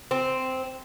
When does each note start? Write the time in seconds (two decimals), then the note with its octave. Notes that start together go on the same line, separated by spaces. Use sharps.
0.11 C4